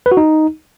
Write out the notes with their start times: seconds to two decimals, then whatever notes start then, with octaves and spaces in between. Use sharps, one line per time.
0.06 B4
0.12 F#4
0.17 D#4